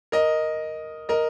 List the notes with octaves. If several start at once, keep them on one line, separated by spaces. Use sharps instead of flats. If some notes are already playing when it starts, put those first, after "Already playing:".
A#4 D#5
A#4 D#5